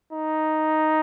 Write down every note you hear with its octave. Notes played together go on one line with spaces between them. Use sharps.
D#4